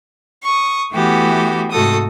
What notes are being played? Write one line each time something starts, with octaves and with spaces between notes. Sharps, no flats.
C#6 D#6
E3 A3 B3 F#4 G4
G#2 C3 A3 F#4 A4 D#6